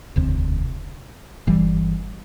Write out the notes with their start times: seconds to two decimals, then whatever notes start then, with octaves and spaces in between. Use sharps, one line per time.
0.16 E1 D2 C3
1.47 G1 G2 E3 G3